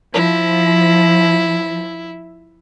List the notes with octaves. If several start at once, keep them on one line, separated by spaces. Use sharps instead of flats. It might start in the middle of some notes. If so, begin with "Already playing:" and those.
F3 E4